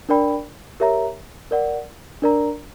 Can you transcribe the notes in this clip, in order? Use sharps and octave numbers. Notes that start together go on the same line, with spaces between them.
D4 A#4 D5 G5 B5
G4 A#4 C#5 E5 A#5
A#4 D5 F#5
D4 A#4 D5 A#5